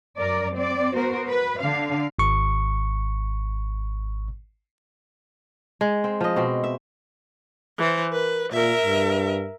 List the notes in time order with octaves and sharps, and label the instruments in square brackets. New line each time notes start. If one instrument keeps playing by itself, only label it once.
[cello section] F#2 A#4 D5
C4 D5
B3 F#4 A#4 C5
B4
D3 F5
[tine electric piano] G#1 C#6
[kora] G#3
C4
F3 D#5
B2 C4
E5
[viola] E3 C5
[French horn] A#4 [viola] B4
[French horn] A#2 [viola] A#4 E5
[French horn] G2